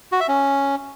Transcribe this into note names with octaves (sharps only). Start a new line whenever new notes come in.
F#4
E5
C#4